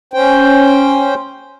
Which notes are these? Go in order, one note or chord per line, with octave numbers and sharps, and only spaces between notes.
C#4 C5 G5